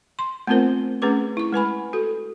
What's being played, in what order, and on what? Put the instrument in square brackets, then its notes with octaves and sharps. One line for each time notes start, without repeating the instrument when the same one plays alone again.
[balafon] C6
A3 B3 C4 F4 A#4 C5
A3 C#4 G#4 B4 D6
E4 C#6
G#3 B4 G#5 B5
F#4 A4